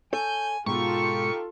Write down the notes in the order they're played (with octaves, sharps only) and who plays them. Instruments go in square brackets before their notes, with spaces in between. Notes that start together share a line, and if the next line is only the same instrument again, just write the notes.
[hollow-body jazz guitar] A4 C#5 [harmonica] G#5 [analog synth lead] G6
[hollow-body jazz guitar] G#2 B2 [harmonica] D#4 G4 [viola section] F4 A4 [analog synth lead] C#6